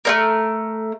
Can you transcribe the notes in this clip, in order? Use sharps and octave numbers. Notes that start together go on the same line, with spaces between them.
A3 C4 A#4